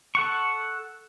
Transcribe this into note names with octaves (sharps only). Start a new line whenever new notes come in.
A4 F#5 C#6